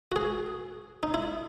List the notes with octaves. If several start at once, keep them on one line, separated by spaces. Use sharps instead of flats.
F#4
G#4
D#4
E4